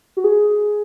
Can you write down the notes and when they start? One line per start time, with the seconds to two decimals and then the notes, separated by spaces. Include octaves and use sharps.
0.17 F#4
0.24 G#4